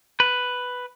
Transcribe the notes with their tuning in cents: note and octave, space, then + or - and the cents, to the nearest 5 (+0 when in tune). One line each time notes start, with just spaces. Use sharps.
B4 +5